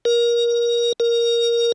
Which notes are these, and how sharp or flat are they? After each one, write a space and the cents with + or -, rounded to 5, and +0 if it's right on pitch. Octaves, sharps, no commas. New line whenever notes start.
A#4 +20
A#4 +5